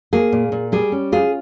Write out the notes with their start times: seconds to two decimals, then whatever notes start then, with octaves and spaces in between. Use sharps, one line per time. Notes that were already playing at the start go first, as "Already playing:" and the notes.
0.13 A#3 G#4
0.32 A#2
0.52 A#2
0.72 G3 G#4
0.92 C#4
1.12 F4 G#4